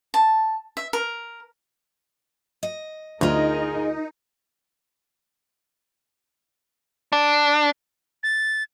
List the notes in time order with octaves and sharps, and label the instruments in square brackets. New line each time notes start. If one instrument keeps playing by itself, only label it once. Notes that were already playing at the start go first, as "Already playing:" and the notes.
[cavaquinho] A5
E5
A#4
[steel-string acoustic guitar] D#5
[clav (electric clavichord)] D2 [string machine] D#4 [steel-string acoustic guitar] F4 G#4 [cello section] A#4 D#5
[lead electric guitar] D4
[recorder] A6